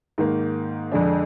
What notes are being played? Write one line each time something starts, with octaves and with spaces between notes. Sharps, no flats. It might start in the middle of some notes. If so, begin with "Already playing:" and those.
G#2 D#3 A#3
F2 D3 G#3 D4